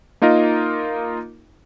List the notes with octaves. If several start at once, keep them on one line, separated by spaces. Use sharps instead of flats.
A#3 D#4 F4 A#4 D#5